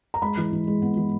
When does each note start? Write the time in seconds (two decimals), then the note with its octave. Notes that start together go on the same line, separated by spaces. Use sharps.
0.14 A#5
0.22 G#3 B5
0.37 E3
0.52 E3
0.67 G#3
0.82 B3
0.97 E3